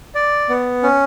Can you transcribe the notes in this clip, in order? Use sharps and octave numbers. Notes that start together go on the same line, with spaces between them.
D5
B3
C#4